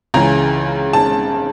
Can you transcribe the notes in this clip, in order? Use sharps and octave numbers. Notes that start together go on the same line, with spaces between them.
C#2 C#3 E3 A#5
A5